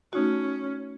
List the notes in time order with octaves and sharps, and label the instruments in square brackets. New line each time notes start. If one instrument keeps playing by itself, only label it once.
[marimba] A3 D#4 F#4 [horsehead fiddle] C#4